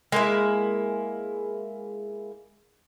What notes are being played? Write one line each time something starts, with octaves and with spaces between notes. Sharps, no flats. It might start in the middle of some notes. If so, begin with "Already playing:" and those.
G#3 A#3 E4